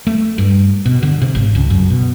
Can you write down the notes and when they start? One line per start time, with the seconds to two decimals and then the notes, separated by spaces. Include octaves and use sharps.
0.07 A3
0.38 G2
0.86 B2
1.03 D3
1.22 C3
1.35 G#1
1.55 C#2
1.70 F#2
1.90 B2